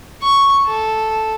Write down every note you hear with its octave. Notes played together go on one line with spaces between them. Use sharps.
C#6
A4